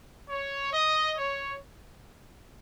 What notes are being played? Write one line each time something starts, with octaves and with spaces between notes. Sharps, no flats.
C#5
D#5
C#5